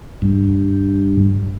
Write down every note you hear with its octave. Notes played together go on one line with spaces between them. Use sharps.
G2